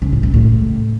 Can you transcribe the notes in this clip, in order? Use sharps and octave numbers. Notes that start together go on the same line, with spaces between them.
C#3
A2
C#3
A2